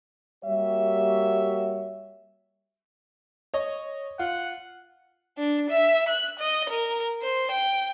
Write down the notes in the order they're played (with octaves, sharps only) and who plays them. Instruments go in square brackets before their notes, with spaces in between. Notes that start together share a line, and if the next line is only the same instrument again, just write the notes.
[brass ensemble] G3 A#3 F#4 G4 C#5 E5
[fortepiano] C#5 D#5
[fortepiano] F4 [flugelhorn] F#5
[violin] D4
E5
F#6
D#5
A#4
C5
G5